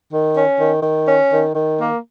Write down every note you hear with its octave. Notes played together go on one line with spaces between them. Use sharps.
D#3
C#4
D#3
D#3
C#4
D#3
D#3
A#3